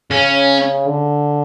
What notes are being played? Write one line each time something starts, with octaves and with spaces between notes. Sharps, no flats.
C#3 C#4
D3